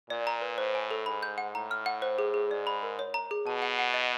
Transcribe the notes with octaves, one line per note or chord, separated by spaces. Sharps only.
A#2 D5
A#5
B4
A2 C5
G#5
A4
G#2 B5
G6
F#5
A2 A#5
F6
F#5
C5
G#4
G#4
G#2 D5
B5
A#4
C#5
A#5
G#4
B2 A5
F#5
F#5
D#5